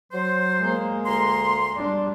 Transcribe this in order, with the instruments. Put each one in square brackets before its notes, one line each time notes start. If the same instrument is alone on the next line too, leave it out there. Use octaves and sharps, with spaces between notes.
[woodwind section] F#3 C5
[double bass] G#3 A#3
[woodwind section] D2 A#5 C6
[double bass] G3 D4